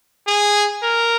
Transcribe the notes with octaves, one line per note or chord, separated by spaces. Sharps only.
G#4
A#4